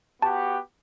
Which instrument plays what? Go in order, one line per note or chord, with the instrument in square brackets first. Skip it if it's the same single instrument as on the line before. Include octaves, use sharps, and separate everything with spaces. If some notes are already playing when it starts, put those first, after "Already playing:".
[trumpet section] B3 F#4 G4 [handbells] A5